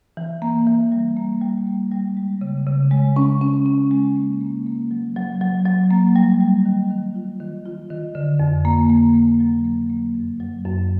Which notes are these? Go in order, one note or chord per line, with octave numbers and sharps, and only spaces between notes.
E3
A#3
E3
G3
A#3
G3
A#3
G3
G#3
C#3
C#3
G#3
C#4
C#4
C#4
G#3
A#3
A#3
A#3
F#3
F#3
F#3
F#3
A#3
G3
G3
D#3
D#3
F4
D#3
F4
D#3
D3
F2
A#3
A#3
A#3
F#3
A#3
A#3
F#2
F#3
F#2